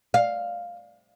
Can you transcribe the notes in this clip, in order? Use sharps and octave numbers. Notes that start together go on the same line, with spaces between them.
F5